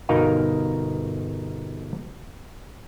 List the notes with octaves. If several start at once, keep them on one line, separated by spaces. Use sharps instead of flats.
G1 B2 D#4 A#4 D#5 F5